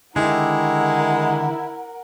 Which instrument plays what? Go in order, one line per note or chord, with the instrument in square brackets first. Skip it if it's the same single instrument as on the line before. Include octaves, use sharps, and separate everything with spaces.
[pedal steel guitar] D3 D#3 G4 [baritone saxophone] G#3 [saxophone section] E4 [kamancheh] A#4 F#5